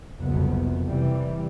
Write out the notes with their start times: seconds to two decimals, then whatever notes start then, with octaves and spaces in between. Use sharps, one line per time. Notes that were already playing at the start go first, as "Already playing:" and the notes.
0.21 F#1 C2 F2 B2 B3
0.88 C3 E3 G3